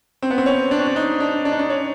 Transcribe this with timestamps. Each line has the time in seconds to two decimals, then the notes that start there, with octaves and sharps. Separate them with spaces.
0.22 C4
0.31 B3
0.38 C4
0.46 C#4
0.71 D4
0.79 C#4
0.87 D4
0.96 D#4
1.20 D4
1.45 D4
1.52 D#4
1.59 D4
1.70 C#4